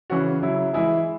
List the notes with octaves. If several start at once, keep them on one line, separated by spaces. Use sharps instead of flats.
C#3 E3 C#4 F#4
C#3 F#3 E4
E3 G#3 E4 G#4